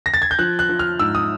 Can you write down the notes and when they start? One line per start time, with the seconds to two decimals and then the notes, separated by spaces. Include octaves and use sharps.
0.06 A#6
0.14 A6
0.22 G#6
0.31 G6
0.39 F3 F#6
0.59 F#6
0.69 F3
0.79 F6
0.99 G#2 E6
1.15 D#6